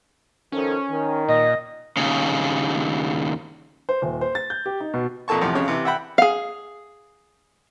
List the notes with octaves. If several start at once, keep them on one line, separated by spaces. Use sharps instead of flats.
D#3 F3 C#4 A4
D#3
A#2 D#5
D#2 C#3
C5
D#1
C5
A6
G6
G4
D#4
B2
F2 A#2 A4 A5 C#6
E2 A2 C3 F3
F2 C#3 C#5
C3 E3
E5 F#5 G5 B5
G#4 F5